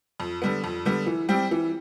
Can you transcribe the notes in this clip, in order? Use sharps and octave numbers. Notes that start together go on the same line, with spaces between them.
F2
D3 G3 B3
F2
D3 G3 B3
E3
G3 C4 G4
E3